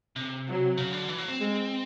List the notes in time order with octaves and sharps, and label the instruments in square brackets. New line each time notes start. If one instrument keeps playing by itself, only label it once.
[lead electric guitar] C3
[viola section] F#3
[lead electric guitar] C#3
D3
E3
F#3
C4
[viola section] G#3